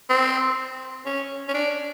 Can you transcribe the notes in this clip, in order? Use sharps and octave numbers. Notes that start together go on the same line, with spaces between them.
C4
C#4
C#4
D4